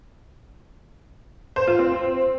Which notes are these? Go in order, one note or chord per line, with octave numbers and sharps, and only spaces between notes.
C5
F4
C4